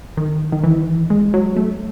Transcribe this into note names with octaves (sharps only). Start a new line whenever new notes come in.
D#3
D#3
E3
G#3
F#3
A3